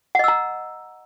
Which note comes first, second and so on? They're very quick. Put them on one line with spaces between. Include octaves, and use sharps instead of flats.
F#5 D#5 E6 A#5